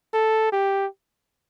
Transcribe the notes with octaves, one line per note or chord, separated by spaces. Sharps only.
A4
G4